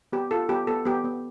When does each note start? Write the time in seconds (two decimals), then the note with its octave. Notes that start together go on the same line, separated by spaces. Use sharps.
0.12 B3 G4
0.31 F4 A4
0.49 B3 G4
0.67 B3 A4
0.85 B3 G4
1.04 B3